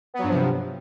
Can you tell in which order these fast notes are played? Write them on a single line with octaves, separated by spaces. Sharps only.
B3 F#3 G2 F3 C3